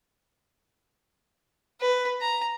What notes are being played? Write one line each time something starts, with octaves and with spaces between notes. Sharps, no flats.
B4
A#5